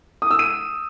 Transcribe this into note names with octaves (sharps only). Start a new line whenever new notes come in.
D#6
E6
D#7